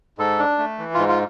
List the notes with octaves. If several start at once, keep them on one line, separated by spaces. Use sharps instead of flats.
G#2 A4
D4
A3
E3
G#2 F4
F4